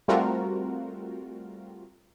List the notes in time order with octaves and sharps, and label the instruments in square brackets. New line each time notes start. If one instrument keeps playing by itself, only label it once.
[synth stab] G3 A3 C4 F4 F#4 A#4